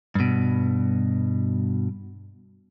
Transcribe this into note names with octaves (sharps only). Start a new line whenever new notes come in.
G2 B2